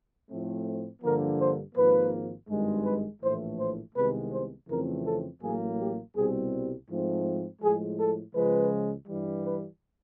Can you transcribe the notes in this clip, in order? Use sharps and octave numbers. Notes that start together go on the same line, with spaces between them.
A2 F3 A3 C4
G2 D3 F3 A#3 A#4
C5
G#1 G#2 F3 A#3 B4
G#1 G2 D#3 G#3
B4
A#1 A2 E3 A3 C5
C5
C2 C3 D#3 G#3 B3 B4
C5
F2 C#3 E3 A3 C4 A#4
A4
A1 A2 F#3 A#3 G#4
G4
C2 B2 G3 C4 G#4
G#2 F3 A3 C4
A2 F3 G#3 G#4
A4
C#2 C#3 F3 G#3 B4
G2 E3 G3
B4